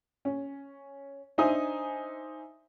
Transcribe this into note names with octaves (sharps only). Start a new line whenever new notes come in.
C#4
D4 D#4 C5 E5 G#5 D#6